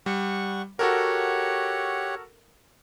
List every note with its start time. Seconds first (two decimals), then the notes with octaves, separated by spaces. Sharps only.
0.06 G3 F#5 C#6
0.79 F#4 G4 A4 A#4 C#5 F#5